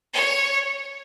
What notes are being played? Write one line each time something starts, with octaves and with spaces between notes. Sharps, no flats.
C#5